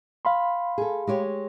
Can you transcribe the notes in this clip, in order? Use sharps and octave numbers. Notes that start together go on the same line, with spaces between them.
F5 B5 C6
G#4 A4
G#3 G4 C#5